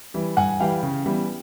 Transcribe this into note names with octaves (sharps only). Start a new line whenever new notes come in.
E3 G3
G2 F#5 G#5
E3 G3 F5 G5
C#3
E3 G3 B3